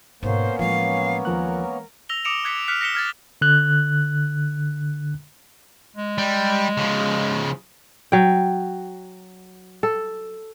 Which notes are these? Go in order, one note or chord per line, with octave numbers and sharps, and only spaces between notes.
G#2 B2 A#3 B3 C#4 C5
A2 E3 F3 G#3 F5
D#2 F3 A#4 F#6
E6 A#6 F7 G7
D6 D#6 C#7 D7 E7 F7
D6 F#6 G#6 B6 C#7
F6 F#6 B6 C#7
A#6 B6 C#7 E7 G7
F6 G#6 A6
D3 F#6
G#3
G3
C#3 F3
F#3 G5
A4